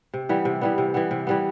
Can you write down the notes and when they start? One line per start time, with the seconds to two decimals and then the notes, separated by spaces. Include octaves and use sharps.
0.14 C3
0.29 E3 G3 B3
0.45 C3
0.61 E3 G3 B3
0.78 C3
0.94 E3 G3 B3
1.11 C3
1.27 E3 G3 B3